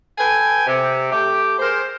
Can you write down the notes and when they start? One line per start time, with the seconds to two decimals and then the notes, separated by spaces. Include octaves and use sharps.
0.18 A4 B4 G5 G#5
0.67 C3
1.11 A3 G4
1.59 G#4 A#4 C5